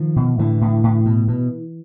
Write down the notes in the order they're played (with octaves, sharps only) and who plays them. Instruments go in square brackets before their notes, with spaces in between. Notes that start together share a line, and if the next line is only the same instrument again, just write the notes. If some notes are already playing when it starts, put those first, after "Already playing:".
Already playing: [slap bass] D#3 F3
B2
A2 D3 E3
A2
A2
B2
B2